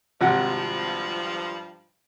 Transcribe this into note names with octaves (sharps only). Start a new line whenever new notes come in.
G#1 G2 C3 F3 F#5